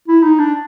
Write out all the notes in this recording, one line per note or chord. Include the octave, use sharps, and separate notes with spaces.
E4
D#4
D4